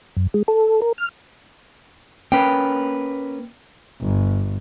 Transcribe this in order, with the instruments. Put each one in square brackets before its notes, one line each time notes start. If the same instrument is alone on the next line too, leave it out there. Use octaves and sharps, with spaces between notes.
[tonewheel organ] F#2
G#3
A4
A#4
F6
[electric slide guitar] A#3 C#4 B4 [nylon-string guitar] G5
[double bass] G1